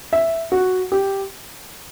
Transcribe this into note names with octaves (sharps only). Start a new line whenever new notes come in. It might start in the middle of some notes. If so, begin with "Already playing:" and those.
E5
F#4
G4